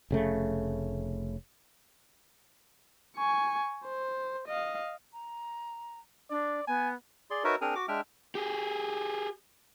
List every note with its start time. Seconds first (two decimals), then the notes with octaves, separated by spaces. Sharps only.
0.11 F1 C#3 A3
3.17 G#5 C#6
3.85 C5
4.48 D#5 F5
5.13 A#5
6.30 D4 D5
6.67 B3 G#5
7.30 G#4 D5 C6
7.44 D#4 F#4 A#4 B4 C#5 E5
7.61 C4 D4 G#4 A#4 G#5 A#5
7.75 F#4 D6
7.88 G#3 D4 E5 G5 F6
8.35 G4 G#4